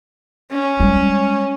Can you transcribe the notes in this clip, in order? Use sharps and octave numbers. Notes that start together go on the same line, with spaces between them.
C#4
G3 G#3